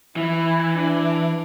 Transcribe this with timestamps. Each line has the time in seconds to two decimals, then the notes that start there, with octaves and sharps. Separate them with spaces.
0.16 E3 E4
0.77 D4